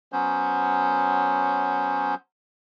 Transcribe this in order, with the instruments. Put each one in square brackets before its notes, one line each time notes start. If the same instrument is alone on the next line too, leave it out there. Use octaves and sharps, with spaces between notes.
[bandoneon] F#3 B3 C#4 C5